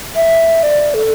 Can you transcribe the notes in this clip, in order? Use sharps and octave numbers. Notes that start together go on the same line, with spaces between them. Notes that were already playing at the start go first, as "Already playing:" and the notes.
E5
D5
A4